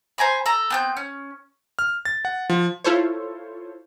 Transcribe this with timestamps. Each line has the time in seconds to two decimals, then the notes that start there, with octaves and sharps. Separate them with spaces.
0.18 C5 G#5 A#5 B5
0.46 A4 A#5
0.70 B3 C4 G6
0.97 C#4
1.79 F6
2.05 A6
2.25 F#5
2.50 F3
2.84 E4 F4 A4 C5 C#5